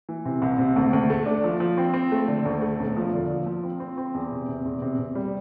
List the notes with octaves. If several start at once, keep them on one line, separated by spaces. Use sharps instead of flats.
E3
C3
C2
C3
D2
D2
A3
D4
F3
F3
C4
C4
A3
D3
D2
A3
E1
F3
D3
F3
F3
C4
C4
C4
E2
C3
C3
E2
C3
C3
G3